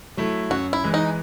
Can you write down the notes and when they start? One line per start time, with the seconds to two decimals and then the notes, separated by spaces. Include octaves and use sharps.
0.17 F#3 A3 E4
0.50 F#2 F#4
0.73 E4
0.84 E3 G#3
0.94 D#4